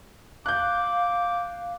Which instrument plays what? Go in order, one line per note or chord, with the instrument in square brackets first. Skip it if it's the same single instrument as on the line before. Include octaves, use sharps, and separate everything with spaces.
[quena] F5 [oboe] D6 [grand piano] F#6 G6